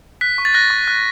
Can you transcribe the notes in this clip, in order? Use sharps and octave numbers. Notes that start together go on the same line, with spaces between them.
F#6 B6
C#6
A6
F#6 A#6
C#6
F#6